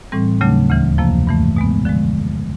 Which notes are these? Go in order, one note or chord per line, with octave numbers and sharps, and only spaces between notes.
A2 E3 G3 C4
D#2 C#3 F#3 A3 D4
D2 C#3 E3
F2 C3 F3 A#3
G2 E3 A3
B2 G#3 B3
D3 F3 G#3